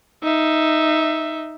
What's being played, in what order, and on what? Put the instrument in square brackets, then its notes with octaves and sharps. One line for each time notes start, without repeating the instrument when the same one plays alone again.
[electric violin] D#4 E5